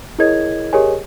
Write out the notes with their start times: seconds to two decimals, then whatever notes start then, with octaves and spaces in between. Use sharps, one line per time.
0.19 E4 G#4 A#4 C#5 D#5 G#6
0.73 G4 G#4 A#4 C#5 D#5 G#5